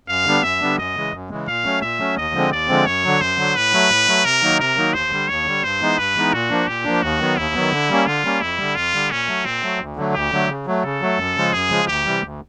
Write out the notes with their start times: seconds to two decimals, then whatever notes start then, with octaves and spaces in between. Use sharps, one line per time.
0.08 F#2 F5
0.25 D3 G3 B3 D4
0.43 F#2 E5
0.60 D3 G3 B3 D4
0.78 F#2 D#5
0.95 C#3 E3 G#3
1.12 F#2
1.30 C#3 E3 G#3
1.47 A#2 F5
1.64 F#3 A3 C#4
1.82 A#2 E5
1.99 F#3 A3 C#4
2.16 D#2 D#5
2.34 D3 F3 G#3 C4
2.51 D#2 D5
2.68 D3 F3 G#3 C4
2.86 F#2 C#5
3.04 D3 F#3
3.21 F#2 C5
3.37 D3 F#3
3.55 A2 B4
3.73 F#3 A3
3.90 A2
4.07 F#3 A3
4.24 C3 A#4
4.42 D#3 F#3 A#3 D#4
4.60 C3 A#4
4.77 D#3 F#3 A#3 D#4
4.94 D#2 C5
5.11 D3 G3
5.28 D#2 C#5
5.46 D3 G3
5.63 G2 C5
5.81 E3 G#3 B3 D#4
5.98 G2 B4
6.15 E3 G#3 B3 D#4
6.33 A#2 F#4
6.50 F3 A#3 D4
6.67 A#2 G4
6.84 F3 A#3 D4
7.02 D#2 F#4
7.19 D#3 F#3 B3
7.37 D#2 E4
7.55 D#3 F#3 B3
7.72 D3
7.89 G3 A#3 C#4
8.06 D3 F4
8.24 G3 A#3 C#4
8.41 F2 E4
8.58 D3 G3
8.75 F2 F4
8.93 D3 G3
9.10 A#2 C#4
9.27 F#3 A3
9.45 A#2 C4
9.63 F#3 A3
9.80 D2
9.97 D3 F#3 A3
10.14 D2 G4
10.32 D3 F#3 A3
10.49 C#3
10.66 F#3 A3
10.84 C#3 A4
11.01 F#3 A3
11.18 F#2
11.36 C#3 F3 G#3
11.53 F#2 G#4
11.70 C#3 F3 G#3
11.87 D2 G4
12.05 C3 E3 G3
12.23 D2